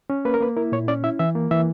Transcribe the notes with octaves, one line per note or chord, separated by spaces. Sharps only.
C#4
A#3 B4
A#4
A#3 B4
E4 A#4
A#2 C#5
C#4 D5
E4 E5
E3 E5
A#3
E3 E5